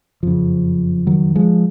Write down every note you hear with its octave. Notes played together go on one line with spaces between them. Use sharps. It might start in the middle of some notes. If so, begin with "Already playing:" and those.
F#1 F2 C#3 F3
D#3 F#3
F3 G#3